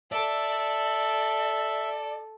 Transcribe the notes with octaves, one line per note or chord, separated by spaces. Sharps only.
A4 D5 E5